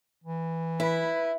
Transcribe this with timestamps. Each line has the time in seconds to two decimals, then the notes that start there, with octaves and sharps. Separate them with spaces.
0.23 E3
0.80 E4 B4